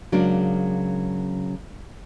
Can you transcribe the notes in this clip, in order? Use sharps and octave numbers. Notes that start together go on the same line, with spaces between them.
C#3 F#3 G#3 A#3 D4